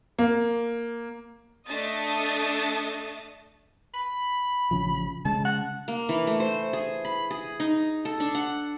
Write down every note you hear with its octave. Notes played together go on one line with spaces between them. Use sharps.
A#3
A3 D4 A4 D#5 D#6 A6
B5
A1 C#3 F3
C#3 G#3 A5
F#5
A#3
E3
A3
C5
G#4
B5
G#4
D#4
A4
D4
F#5